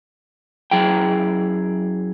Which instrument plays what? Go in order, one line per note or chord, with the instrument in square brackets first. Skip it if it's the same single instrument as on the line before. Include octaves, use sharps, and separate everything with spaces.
[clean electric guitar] F#2 F#3 E4 G#4 G5